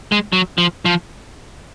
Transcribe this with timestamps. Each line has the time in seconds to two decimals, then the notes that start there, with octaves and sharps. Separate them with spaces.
0.12 G#3
0.33 F#3
0.58 F3
0.85 F3